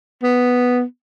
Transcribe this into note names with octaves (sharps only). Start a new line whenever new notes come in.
B3